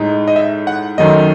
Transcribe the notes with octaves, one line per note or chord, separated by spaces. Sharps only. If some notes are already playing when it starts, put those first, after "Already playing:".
Already playing: A2 G#3 D#4
D#5
E5
F#5
F#2 D#3 F#3 A3 D#5